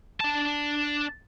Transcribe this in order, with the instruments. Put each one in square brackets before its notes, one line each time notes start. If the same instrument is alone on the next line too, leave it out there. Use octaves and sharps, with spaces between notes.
[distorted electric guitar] D4 A5